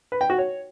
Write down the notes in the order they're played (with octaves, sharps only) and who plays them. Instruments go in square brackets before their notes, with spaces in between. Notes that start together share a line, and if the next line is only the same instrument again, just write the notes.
[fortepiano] B4
G5
F#4
C#5